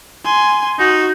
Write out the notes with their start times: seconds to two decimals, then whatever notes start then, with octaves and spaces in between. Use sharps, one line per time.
0.24 G#5 C6
0.79 D#4 F#4